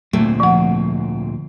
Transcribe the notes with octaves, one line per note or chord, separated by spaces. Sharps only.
D2 A#2 A3 C4
F3 F#5